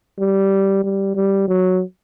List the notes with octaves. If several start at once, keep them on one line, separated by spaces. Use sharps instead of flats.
G3
G3
G3
F#3